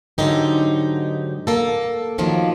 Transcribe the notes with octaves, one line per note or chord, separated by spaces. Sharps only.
G#2 D3 F#3 D#4 G4
A#3 A4
A2 D#3 F3 F#3 A#3